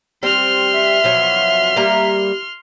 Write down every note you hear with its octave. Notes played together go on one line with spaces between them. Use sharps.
G3 C4 C6 F6
E5
B2 F3 F#3
G3 A#3 A#5